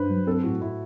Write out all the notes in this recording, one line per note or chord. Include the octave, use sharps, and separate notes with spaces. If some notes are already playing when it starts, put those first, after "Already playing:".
Already playing: G2 B4 C5
F#3
C4 A4
A2 F#4
A2 E4